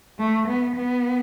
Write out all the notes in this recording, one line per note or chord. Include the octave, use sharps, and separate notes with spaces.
A3
B3
B3